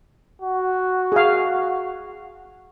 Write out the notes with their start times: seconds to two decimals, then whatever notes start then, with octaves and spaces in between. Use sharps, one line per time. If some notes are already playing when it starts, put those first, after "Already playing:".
0.42 F#4
1.12 G#4 F5